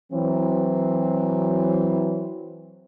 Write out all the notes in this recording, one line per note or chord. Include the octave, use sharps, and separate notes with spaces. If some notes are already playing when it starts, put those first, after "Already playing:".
E3 F#3 C4